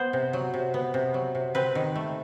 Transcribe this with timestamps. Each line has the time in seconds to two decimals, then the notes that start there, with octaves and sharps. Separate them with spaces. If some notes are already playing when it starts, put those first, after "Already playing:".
Already playing: B3 C5
0.13 C3
0.33 F#3
0.54 C3
0.74 B3
0.94 C3
1.14 F#3
1.35 C3
1.55 C4 B4
1.75 D#3
1.95 A3